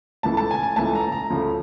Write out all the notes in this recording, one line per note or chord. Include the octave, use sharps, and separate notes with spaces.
C#2 C#3 E3 A3 A5
A5
G#5
G#5
C#2 C#3 E3 A3 A5
A#5
A#5
D2 C#3 F3 A3